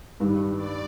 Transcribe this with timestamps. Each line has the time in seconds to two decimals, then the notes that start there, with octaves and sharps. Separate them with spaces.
0.20 G2 D#3 G3
0.55 D5